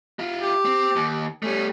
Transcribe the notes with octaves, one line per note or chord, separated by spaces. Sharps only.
E4 F4
G4
C4
D#2
G3 A3 C#4